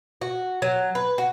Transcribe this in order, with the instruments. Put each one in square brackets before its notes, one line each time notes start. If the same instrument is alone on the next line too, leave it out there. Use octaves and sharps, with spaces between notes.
[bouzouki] F#4
F#3
B4
F#4